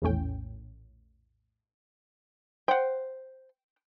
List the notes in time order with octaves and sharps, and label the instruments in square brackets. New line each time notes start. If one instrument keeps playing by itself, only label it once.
[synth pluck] A#1 E2 A2 C#4 G5
[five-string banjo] C5 [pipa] F#5 G5